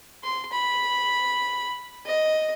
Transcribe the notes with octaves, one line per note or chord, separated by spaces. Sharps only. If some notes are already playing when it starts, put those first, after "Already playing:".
C6
B5
D#5